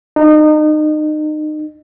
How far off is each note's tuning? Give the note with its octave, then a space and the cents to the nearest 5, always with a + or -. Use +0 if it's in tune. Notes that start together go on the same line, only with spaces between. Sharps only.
D#4 -30